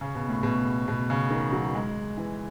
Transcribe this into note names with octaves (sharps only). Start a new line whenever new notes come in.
C#3
B2
A2
B2
B2
C#3
D#3
F#3
G#3
E3